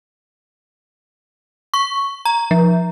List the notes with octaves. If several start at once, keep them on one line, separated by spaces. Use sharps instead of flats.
C#6
A#5
F3